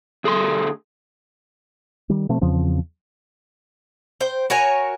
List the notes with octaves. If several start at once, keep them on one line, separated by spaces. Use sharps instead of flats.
D2 G#4 A4 C6
D#3 G3
B2 F3 A3 C4
E2 C#3 F3 C4
C5 G5
F#4 A#4 C#5 G#5